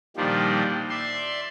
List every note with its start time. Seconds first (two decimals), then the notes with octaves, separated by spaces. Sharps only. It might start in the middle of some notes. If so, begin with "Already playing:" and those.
0.17 A#2 D#3 F3 G3 D4
0.90 D5 E5 C6